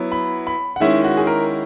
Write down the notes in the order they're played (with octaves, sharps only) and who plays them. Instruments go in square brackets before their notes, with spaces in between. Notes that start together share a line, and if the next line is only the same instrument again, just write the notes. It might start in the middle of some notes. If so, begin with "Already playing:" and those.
Already playing: [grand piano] F#3 B3 E4
B5
B5
F#5
D#3 G#3 C#4 E4 E5
F#4
G#4
A#4